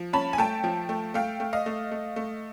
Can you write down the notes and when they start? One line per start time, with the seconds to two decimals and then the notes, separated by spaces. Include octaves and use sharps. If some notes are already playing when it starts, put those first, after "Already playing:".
Already playing: F3
0.13 C#4 A5 B5
0.33 G#5
0.38 A3 G5 A5
0.64 F3
0.89 A3
1.14 A3 F5 G5
1.40 A3
1.53 D#5 F5
1.66 A3
1.91 A3
2.16 A3